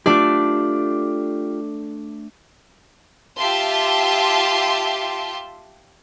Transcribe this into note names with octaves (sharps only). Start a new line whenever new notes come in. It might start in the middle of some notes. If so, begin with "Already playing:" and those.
A3 D4 F4 G4 D5
F4 G4 E5 A5 C6